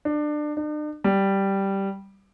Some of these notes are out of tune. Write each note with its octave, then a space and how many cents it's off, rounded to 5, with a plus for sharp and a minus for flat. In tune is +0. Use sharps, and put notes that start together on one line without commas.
D4 +25
D4 +45
G3 -5